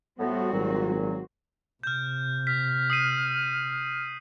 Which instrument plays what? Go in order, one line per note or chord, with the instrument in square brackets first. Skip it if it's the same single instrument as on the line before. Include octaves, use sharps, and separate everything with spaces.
[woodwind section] A2 B3 [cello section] G3 C4 F#4
[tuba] G#1 [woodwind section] A#2 F#3
[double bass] C3 [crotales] F6 G6
[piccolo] F6 [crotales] B6
[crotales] D#6 C7 D#7